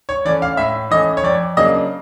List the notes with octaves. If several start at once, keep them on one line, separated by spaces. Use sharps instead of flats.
C#5
E3 A3 C#4 D5
F5
A2 E5
E3 A3 C#4 D#5
C#5
F2 D5
C#3 F#3 A#3 D4 D#5